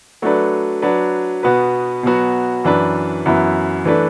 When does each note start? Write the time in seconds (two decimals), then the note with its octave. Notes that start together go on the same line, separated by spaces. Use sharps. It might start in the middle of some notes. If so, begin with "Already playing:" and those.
0.22 F#3 A3 D4 B4
0.82 F#3 D4 B4
1.43 B2 B3 F#4 B4
2.03 B2 F#3 B3 F#4
2.64 F#2 E3 D4 B4
3.26 F#2 E3 B3 E4
3.85 E3 A3 D4 B4